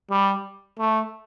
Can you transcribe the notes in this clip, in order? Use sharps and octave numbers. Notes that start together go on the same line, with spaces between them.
G3
A3